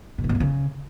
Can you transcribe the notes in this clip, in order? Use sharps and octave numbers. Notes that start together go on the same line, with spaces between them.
B2
A2
A#2
G2
C#3